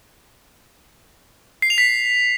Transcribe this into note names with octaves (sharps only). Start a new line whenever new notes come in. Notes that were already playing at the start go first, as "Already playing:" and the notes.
C7
F7
B6